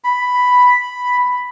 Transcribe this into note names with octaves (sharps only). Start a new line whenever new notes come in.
B5